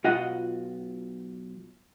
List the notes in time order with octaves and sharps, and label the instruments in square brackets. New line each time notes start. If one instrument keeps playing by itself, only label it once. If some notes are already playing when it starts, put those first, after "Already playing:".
[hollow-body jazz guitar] B1 F4 F#4 D#5 F#5